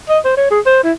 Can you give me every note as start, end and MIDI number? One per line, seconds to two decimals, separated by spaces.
0.09 0.19 75
0.25 0.36 72
0.37 0.47 73
0.50 0.60 68
0.66 0.82 72
0.84 0.92 64